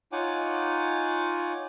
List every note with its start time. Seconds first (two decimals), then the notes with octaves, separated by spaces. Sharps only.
0.12 D#4 F4 C#5 F#5 G#5 D6